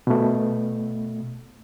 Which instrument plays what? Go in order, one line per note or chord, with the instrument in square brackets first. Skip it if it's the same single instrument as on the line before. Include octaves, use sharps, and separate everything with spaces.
[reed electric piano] B2 A3